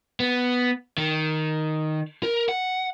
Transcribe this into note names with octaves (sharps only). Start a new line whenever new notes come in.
B3
D#3
A#4
F#5